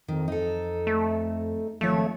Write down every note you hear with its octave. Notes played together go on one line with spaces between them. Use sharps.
F2 D#3
D#4 A4
A3
G#1 F3 A3 C#5